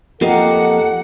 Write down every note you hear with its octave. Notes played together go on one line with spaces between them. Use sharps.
F2 A#3 F4 G4 A4 A#4 D#5 F#5